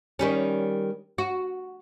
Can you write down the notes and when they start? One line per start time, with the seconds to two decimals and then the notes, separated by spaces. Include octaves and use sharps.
0.19 D#3 G3 C#4
1.18 F#4